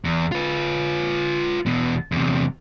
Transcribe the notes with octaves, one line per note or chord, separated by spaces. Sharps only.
E2
F4 B4
E2 B2
E2 C3